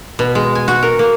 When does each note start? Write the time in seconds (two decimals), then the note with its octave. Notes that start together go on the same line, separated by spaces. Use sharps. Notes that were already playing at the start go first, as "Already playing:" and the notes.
0.19 B2
0.35 G#3
0.55 G#5
0.68 F#4
0.83 A#4
0.99 A#3